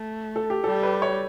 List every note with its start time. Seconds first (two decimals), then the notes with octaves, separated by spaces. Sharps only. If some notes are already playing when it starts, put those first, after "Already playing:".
Already playing: A3
0.36 A4
0.50 G4
0.64 G3 A4
0.83 B4
1.02 C#5